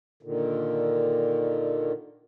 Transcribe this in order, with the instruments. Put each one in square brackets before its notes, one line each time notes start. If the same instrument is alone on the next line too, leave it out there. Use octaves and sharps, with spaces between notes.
[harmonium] A#2 D3 D#3